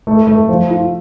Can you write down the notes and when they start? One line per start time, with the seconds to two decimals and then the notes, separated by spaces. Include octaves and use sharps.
0.07 A3
0.27 A3
0.49 F3
0.70 F4